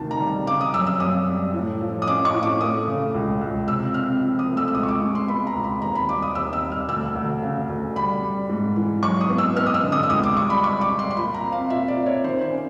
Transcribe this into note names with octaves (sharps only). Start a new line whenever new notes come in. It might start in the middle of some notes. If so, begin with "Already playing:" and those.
Already playing: D2 C3 D#3 A5
A#5
G3
C#3 D6
D#6
F#2 E6
E6
F#2 D#6
G3
A2
F3
D#6
C#4 D6
C#6
A2
D6
A3 D#6
C#3
C#2
C#2
C3 E6
C4 F6
F3
D#6
A3
E6
E6
C#2 D#6
C#6
D6
G#3
C6
B3 B5
A#5
C#2
B5
D#2 A#5
B5
G3 D6
D#6
D#2 E6
E6
G3
F6
D2 E6
D2
C#3
D2
G3 B5
G3
G#2
E3
F#3 C#6
D#6
B3
E6
B3 F6
D#6
E6
D3
D#6
E6
C#2 D#6
D6
G3 C#6
B5
G3 C#6
D6
G3
C6
C6
A#2 B5
A#5
C4
F5
A#2 E5
D5
A#2
C#5
D#3 C5
C5
C#4